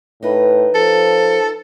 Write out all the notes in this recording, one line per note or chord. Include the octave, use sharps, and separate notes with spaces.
A2 D#4 B4
F3 A4